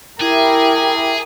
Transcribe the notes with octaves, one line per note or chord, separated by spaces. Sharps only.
E4 G4 G#4 A#4